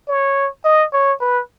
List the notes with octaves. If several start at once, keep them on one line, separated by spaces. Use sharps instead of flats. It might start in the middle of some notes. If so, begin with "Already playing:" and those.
C#5
D#5
C#5
B4